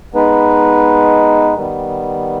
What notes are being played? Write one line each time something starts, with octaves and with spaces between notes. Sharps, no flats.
G#3 B3 D#4 B4
D#3 G3 B3